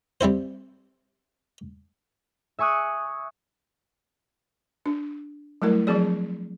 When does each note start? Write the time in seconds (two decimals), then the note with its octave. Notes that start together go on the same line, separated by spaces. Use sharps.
0.21 G3 C4 E4 C5
2.59 E5 G#5 C#6 D#6 F#6
4.86 D4
5.62 F#3 G3 A3 E4 A#4
5.87 F3 F#3 C4 G#4 D5